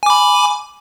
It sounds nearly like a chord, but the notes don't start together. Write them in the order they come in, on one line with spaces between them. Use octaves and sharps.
G#5 D6 B5